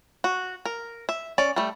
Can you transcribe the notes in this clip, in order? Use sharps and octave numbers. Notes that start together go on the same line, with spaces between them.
F#4
A#4
E5
C#4 D5
G3 A3